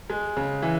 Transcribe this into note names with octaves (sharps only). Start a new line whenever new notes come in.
G#3
C#3
E3